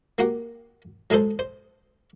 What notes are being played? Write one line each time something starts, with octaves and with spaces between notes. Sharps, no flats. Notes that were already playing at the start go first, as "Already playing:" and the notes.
A#3 F#4 G4 F#5
F#3 G#3 G#4 A4 C5
C5